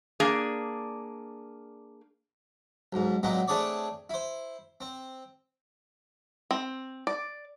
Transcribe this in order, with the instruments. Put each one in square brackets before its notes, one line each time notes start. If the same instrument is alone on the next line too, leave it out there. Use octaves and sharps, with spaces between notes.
[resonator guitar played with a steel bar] A#3 D4 G#4
[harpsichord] B1 G#2
A#2 F#3 G#3 B3 C4
A3 C4 D4 G#4 C#5 D5
E4 C5
C4
[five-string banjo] C4
D5